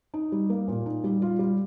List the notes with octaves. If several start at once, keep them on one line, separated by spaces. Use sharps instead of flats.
D#4
G3
A#3
A#2
D#4
G3
F4
G3